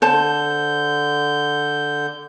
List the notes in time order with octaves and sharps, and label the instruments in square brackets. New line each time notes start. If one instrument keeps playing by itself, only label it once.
[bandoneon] D3 G6 [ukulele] C5 A5